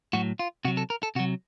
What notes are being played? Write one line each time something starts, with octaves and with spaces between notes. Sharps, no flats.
A2 F#3 F#4
F4
C3 F#3 F#4
A4
A#4
A4
C3 F#3 F#4